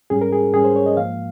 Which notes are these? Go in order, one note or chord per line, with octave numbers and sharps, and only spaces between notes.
G#2 G3 C#4 G#4
A#4
G#4
G#2 G3 C#4 G#4
C5
C#5
D#5
G#2 F3 A#3 F5